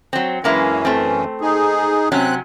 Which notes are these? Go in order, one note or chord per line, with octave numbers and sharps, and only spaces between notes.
F#3 C4
F#2 E3 G#3 A#3 C#4 E4
A3 C4
D#4 G#4
C3 F#3 C4 C#4 F#6